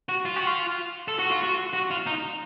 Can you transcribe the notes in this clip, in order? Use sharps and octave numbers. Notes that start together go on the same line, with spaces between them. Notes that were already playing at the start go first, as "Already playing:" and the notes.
F#4
F4
F#4
F4
A4
F#4
F4
F#4
F#4
F4
D#4